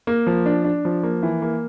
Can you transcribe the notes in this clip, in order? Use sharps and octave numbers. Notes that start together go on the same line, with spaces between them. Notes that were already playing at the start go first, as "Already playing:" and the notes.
A#3
F3
D4
D4
F3
A#3
E3
A#3